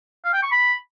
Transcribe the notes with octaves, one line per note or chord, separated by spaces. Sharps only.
F5
G5
C#6
B5